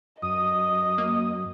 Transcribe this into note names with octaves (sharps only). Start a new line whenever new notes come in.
F#2 D#5 D#6
A#3